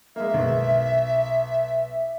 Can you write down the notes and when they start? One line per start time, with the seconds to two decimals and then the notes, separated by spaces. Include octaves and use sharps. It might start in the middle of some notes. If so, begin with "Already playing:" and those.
0.16 G#3 A#3 E5
0.34 B1